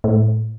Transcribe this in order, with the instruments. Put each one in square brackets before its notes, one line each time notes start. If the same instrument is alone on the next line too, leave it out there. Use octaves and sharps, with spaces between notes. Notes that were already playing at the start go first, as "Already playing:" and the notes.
[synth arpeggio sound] A2